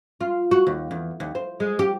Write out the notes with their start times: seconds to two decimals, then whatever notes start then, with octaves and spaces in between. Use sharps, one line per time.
0.21 F4
0.51 F#4
0.67 D#2
0.91 E2
1.20 D#2
1.35 C5
1.60 G#3
1.79 G4